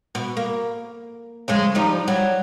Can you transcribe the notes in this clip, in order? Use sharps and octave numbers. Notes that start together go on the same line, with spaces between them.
B2
A#3
F2 C#3 G#3
F3 G3 D#4
F#3 G3